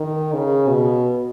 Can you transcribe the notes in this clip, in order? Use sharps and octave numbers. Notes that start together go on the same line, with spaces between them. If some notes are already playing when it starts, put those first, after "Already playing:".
Already playing: D#3
C#3
B2